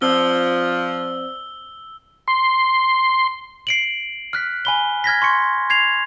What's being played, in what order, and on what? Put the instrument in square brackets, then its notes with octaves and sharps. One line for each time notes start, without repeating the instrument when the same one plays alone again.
[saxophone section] F3 [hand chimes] C4 C5 D5 [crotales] E6 G7
[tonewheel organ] C6
[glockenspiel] C7 D7 F#7
F6 F#6 B6
G#5 B5 G7
F6 G#6 A#6 B6
C6 C#6 C#7
G#6 C7 F7